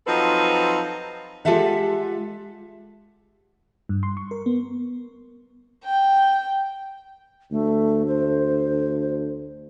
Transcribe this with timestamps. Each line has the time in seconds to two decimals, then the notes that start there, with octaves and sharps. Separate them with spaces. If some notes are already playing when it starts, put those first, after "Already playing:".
0.06 F3 F#3 C4 D#4 A4 B4
1.45 G#3 F4 G4 A4 E5 F#5
3.89 G2
4.03 C6
4.17 C#6
4.31 A#4
4.46 B3
5.84 G5
7.51 D2 A3
8.07 C5